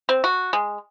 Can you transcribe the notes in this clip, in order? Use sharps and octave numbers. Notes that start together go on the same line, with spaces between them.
C4
F#4
G#3